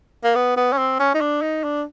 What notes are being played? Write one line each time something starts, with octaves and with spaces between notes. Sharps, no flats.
A#3
B3
B3
C#4
C4
C#4
D#4
D4
D#4
D4